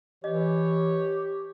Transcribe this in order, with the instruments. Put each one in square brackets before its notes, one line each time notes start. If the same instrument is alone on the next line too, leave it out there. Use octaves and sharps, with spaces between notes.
[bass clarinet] E3 [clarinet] G4 [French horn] C#5 [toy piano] D#5